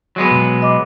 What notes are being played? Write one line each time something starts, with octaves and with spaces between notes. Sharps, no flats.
F#3 G#3 B3
B2
D#5 D6